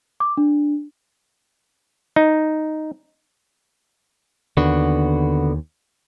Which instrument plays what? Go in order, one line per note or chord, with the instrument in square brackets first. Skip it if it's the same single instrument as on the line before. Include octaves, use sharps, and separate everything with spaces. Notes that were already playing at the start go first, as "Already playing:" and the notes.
[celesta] D6
D4
[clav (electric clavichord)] D#4
[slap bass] D#2 [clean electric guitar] D3 B3 F#4